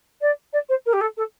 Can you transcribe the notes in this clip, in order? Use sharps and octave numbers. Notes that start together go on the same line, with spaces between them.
D5
D5
C5
A#4
G4
A4
A4